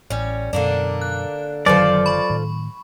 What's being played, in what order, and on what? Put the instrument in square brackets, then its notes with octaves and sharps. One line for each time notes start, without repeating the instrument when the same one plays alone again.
[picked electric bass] A1 [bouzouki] G3 C#4
[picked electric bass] F#2 B2 [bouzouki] D3 A#3 D4
[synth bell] F#6
[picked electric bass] F#1 D3 D#3 [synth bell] F#3 [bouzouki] F4 A4 C5 [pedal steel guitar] D5
[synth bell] B5 C#6
[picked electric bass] A2 D#3